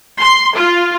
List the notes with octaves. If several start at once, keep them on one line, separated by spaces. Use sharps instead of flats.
C6
F4